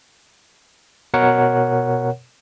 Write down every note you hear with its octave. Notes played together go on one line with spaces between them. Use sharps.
B2 A#4 C#5 F#5